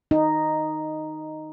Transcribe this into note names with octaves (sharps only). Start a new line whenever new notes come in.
D#4